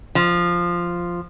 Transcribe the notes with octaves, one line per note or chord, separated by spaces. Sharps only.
F3